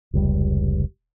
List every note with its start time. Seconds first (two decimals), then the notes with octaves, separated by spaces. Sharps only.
0.14 F1 C#2 G3